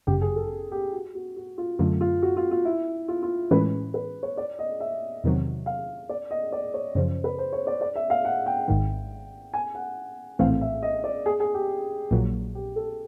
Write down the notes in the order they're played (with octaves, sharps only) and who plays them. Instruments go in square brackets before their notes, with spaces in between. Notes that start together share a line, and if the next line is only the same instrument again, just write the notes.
[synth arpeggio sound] G1 F#2 C#3 [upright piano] G4
[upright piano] G#4
A4
G4
F#4
F#4
F#4
F4
[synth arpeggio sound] F#2 D3 F#3 A3 [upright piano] F4
[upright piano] F4
F#4
F4
F4
E4
F4
F4
[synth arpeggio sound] A2 E3 G#3 C#4 [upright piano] B4
[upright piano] B4
C#5
D5
D#5
E5
[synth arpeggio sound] E2 C3 D#3 F#3
[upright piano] F5
D5
D#5
D5
C#5
[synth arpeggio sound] F#2 C#3 F3 [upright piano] C5
[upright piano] B4
C5
C#5
D5
D5
E5
F5
F#5
G5
[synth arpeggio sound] G#1 G#2 D#3
[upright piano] G#5
F#5
[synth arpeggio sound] A#1 A2 E3 A3 C4 [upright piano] F5
[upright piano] E5
D#5
D5
G#4
G#4
G4
[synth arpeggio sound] A#1 A#2 F#3
[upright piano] G4
A4